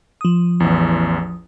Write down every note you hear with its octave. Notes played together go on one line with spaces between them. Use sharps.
F3 D#6
A1 E2